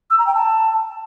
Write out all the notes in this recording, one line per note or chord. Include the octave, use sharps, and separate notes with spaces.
E6
A#5
G5
A5